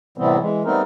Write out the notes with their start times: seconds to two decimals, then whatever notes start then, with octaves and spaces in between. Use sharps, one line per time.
0.18 A2 C3 E3 G3 B3 C4
0.39 E3 G#3
0.65 G3 A3 B3 C4 D#4 A#4